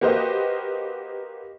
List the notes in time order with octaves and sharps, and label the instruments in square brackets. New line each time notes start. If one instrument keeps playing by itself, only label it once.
[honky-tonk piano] A#3 F#4 G4 B4 C5 D#5